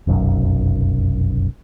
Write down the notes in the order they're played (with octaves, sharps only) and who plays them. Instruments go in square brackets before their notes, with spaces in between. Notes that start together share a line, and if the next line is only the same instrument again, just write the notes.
[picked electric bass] F1 B1 F#2